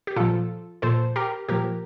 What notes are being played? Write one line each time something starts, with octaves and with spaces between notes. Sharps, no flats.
G4
A#2 F3 F4 A4
A#2 F3 A4 C5
G4 A#4
A#2 F3 G4 A#4